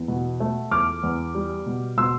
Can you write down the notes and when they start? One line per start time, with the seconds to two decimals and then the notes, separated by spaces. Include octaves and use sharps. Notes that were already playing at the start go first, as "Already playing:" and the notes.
Already playing: E2
0.08 B2
0.40 A3
0.71 E2 D6 F6
1.03 E2
1.35 G3
1.66 B2
1.97 B2 C6 E6